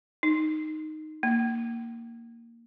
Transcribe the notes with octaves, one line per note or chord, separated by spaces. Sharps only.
D#4
A#3